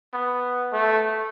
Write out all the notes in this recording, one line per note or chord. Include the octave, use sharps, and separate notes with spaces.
B3
A3